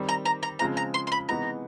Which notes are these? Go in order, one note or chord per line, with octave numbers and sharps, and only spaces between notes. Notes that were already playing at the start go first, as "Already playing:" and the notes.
Already playing: D#3 G3 C4
A#5
A#5
A#5
C#3 F3 G#3 C4 F4 A#5
A#5
C6
C6
B5
C3 E3 G#3 B3 D#4 A#5